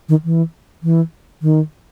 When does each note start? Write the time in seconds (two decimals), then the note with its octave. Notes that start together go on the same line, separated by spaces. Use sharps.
0.09 D#3
0.24 E3
0.83 E3
1.42 D#3